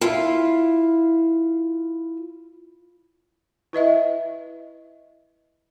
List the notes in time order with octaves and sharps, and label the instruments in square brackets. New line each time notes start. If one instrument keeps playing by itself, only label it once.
[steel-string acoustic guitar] E4 F4 F5
[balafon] E4 B4 D#5 E5